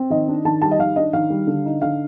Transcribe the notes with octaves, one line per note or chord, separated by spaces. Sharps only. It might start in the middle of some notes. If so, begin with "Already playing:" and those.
Already playing: C4
D#3 D#5
D4
D#3 A5
G3 A5
D#5
D#3 F5
D4 D#5
D#3 F5
G3
D3
D#4
D3 F5